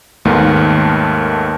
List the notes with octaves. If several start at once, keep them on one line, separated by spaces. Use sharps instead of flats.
D#2 G#2 D#3 A3 B3 D#4